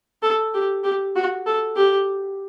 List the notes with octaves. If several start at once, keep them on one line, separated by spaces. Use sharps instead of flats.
A4
G4
G4
F#4
A4
G4